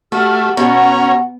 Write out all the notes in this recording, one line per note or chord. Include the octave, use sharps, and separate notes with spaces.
A3 F#4 G4 F6
B2 C#4 F#5 A#5